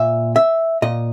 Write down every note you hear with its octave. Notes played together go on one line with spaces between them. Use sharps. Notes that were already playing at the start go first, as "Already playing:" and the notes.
Already playing: A#2 E5
E5
A#2 D#5